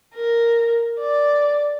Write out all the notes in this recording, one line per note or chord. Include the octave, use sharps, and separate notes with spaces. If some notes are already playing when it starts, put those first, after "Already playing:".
A#4
D5